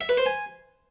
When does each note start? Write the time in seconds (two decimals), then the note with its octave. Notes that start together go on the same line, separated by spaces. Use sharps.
0.01 E5
0.09 B4
0.18 C5
0.26 G#5